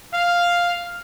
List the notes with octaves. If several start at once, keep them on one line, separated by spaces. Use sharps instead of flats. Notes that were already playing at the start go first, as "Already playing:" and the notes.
F5